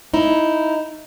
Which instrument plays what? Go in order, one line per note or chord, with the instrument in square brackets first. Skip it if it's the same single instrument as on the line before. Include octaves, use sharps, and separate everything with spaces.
[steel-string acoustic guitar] D#4 E4